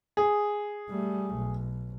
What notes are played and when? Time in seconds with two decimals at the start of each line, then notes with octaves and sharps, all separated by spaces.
0.17 G#4
0.89 G3 A3
1.35 B1